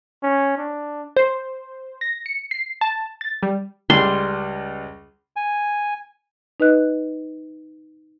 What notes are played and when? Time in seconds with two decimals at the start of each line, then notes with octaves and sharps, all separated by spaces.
0.23 C#4
0.58 D4
1.17 C5
2.01 A#6
2.26 C#7
2.51 C7
2.81 A5
3.21 A6
3.43 G3
3.90 C#2 G3 C6
5.36 G#5
6.60 D#4 B4 D#5 F#6